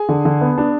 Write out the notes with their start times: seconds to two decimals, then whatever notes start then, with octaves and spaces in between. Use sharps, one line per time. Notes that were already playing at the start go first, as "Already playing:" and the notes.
Already playing: G#4 G#5
0.09 D3
0.25 D3
0.41 B3
0.58 D4